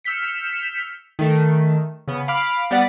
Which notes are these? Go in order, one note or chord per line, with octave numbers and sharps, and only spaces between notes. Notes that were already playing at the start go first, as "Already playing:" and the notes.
E6 F6 G6 B6 C#7
D#3 A3
C#3 B3
F5 B5 D6 F6
G3 B3 D5 F#5 A6 B6